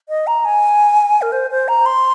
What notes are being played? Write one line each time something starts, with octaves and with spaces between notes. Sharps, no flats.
D#5
A#5
G#5
A#4
C5
C5
A#5
C6